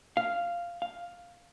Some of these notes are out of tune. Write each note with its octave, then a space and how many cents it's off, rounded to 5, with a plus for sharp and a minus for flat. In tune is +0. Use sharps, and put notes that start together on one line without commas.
F5 -5
F5 +5